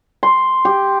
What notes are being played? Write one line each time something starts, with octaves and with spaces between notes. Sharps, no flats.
C6
G4